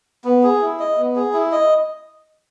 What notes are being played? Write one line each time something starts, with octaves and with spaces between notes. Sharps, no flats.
B3
G#4
E4
D#5
B3
G#4
E4
D#5